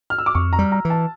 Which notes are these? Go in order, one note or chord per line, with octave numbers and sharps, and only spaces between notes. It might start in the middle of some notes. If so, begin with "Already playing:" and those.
F6
E6
D6
F2 C#6
A#5
G3
A#5
E3
A5